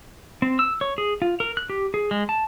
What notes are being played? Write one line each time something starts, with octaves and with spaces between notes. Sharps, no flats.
C4
E6
C#5
G#4
F4
A#4
F#6
G4
G#4
G#3
A5